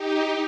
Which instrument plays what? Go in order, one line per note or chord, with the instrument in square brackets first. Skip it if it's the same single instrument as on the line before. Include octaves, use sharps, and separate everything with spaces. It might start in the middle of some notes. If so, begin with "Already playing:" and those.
Already playing: [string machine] D#4 G4